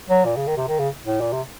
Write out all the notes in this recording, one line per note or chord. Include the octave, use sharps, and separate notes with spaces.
F#3
A#2
C#3
D#3
C3
D#3
C#3
A2
A#2
C3